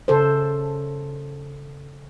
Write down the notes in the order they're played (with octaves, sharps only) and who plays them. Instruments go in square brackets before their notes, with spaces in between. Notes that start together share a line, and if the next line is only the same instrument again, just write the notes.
[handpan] C#3 A4 C5